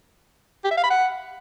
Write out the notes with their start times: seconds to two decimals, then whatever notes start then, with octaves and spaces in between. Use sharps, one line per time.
0.64 G4
0.71 E5
0.77 F5
0.84 B5
0.90 F#5